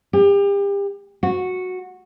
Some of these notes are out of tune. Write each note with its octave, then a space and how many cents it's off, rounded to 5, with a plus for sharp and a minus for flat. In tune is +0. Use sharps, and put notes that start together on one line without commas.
G4 +35
F#4 -10